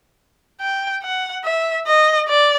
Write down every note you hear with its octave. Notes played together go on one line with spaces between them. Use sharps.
G5
F#5
E5
D#5
D5